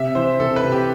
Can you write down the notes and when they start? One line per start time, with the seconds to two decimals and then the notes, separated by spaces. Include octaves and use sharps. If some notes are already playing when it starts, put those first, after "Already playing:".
Already playing: C3 E5
0.15 E3 C5
0.40 C3 A4
0.56 B4
0.64 C3
0.72 G4